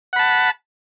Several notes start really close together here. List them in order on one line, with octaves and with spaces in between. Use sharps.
F#5 B5 A5